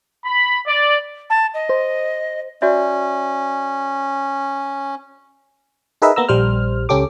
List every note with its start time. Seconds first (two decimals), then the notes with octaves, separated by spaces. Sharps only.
0.25 B5
0.66 D5
1.30 A5
1.54 D#5
1.69 C5
2.62 C#4 F#4 D5 E5
6.02 D#4 G#4 A#4 B4 D#5 E5
6.16 A#3 B3 A#5 E6
6.29 A#1 G3 C5 F6
6.89 C#2 C#4 G4 A4 D6